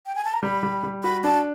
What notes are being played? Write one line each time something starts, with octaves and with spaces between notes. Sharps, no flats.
G5
G#5
A5
A#5
G3 B5
G3
G3
F#4 B5
D4 A5